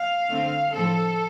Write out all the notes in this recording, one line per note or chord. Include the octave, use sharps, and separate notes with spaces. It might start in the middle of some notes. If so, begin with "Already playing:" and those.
Already playing: F5
D3 A3 C4
A2 F3 C4 A4